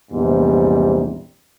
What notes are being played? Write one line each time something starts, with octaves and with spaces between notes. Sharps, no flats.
A#1 E2 G#2 C3 G3